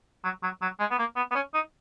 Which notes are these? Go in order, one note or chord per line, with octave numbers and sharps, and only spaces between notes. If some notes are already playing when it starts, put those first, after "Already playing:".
F#3
F#3
F#3
G#3
B3
A#3
B3
B3
C#4
D#4